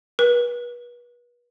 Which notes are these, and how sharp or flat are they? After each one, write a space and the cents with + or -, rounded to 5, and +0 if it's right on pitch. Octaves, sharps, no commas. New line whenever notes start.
B4 -35